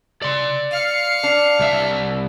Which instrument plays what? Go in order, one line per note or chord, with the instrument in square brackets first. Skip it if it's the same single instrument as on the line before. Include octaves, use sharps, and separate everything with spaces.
[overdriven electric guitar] D5 C6
[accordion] F5 [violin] F6 C#7
[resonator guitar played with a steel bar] D4
[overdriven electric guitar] C2 E5